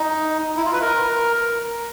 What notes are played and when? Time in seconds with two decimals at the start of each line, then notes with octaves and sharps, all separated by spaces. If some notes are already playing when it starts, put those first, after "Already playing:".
Already playing: D#4
0.57 E4
0.65 F4
0.73 B4
0.82 A#4